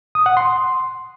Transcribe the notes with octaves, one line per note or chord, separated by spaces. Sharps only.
D#6
F#5
C6